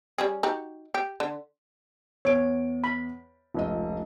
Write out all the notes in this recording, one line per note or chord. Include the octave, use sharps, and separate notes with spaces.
G3 C#4 G#4
D#4 F#4 G4
G4
D3
E2 C#5 D7
B5
F1 C#2 D#5